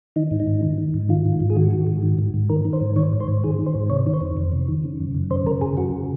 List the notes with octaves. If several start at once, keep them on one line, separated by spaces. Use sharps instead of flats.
D#3 D#4
G#2
D#4
G#2
D#3
D#3
G#2
D#3 F4
G#2
F4
G#2
G#4
D#3 F#4
D#3
G#2
D#3
G#2
G#2
D#3 A#4
D#3
C5
G#2
D#3 C#5
G#2
C5
G#2
D#3 G#4
D#3
C5
G#2
C3 C#5
D#3
C5
F2
F2
C3
D#3
C#3
F#2
F#2
C#3 C5
C#3 A#4
F#2 G#4
C#3 F#4